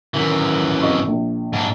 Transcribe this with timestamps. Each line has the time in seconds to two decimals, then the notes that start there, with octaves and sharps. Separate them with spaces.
0.14 F#2 D#3 E3
0.82 G#1 D#5 C#6
1.07 A#1
1.53 G#2 D4